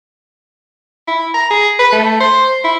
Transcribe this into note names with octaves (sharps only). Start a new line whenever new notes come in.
E4
A#5
G#4
B4
A3
C5
E4